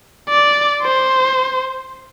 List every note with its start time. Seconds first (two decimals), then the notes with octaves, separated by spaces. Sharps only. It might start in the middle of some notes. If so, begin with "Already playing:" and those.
0.29 D5
0.83 C5